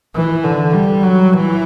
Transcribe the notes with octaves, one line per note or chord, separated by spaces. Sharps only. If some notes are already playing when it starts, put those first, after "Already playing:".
E3
D3
G3
F#3
E3